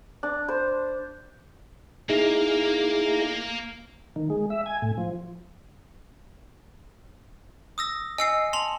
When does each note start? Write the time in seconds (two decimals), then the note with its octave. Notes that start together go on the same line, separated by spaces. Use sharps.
0.23 D4
0.48 C5
2.09 A#3 D#4 E4 G#4 A#4
4.16 D#3
4.30 G#3
4.50 E5
4.66 G#5
4.82 A2
4.98 F3
7.78 D#6 E6 A#6
8.18 D#5 G#5 E6 C7 C#7
8.53 A5 C6 F7 F#7